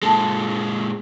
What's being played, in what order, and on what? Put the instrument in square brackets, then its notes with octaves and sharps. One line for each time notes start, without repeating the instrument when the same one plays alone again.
[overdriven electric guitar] A#2 G#3 [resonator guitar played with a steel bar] A4